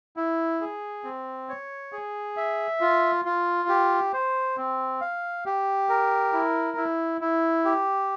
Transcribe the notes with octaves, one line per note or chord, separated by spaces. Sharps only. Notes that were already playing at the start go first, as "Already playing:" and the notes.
E4
G#4
C4
C#5
G#4
E5
F4
F4
G4
C5
C4
F5
G4
A#4
E4
E4
E4
G4